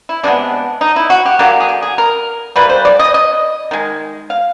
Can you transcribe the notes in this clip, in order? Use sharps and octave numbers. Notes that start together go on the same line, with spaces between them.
E4
C3 F3 G#3 B3 D4
D#4
E4
F#4
G4
D3 F#3 A#3
G#4
G4
G#4
A#4
E3 G3 A#3 B4
C5
D5
D#5
D#5
D#3 G#3
F5